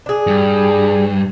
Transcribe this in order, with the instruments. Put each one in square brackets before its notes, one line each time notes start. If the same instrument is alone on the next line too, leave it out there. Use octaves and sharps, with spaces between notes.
[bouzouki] D4 G#4
[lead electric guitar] G2